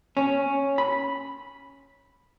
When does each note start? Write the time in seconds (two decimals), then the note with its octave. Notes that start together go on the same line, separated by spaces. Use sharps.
0.17 C#4
0.78 B5